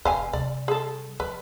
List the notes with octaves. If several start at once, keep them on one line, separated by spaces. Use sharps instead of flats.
F1 C4 B4 F5 G#5
C3 G3 D5
G#4 A4
F3 B4